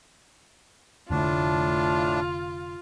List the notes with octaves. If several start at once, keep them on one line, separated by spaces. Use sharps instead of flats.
F1 A2 D3 A3 D4 F4